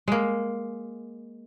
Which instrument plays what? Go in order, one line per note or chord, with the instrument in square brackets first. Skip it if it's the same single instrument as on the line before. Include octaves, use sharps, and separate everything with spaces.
[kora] G#3 A#3